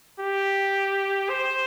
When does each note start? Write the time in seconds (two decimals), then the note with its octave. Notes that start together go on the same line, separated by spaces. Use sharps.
0.21 G4
1.30 C5